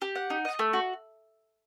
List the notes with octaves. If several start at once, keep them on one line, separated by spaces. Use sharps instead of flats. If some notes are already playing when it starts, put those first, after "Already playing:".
G4
F#5
D#4
D#5
A3
F#4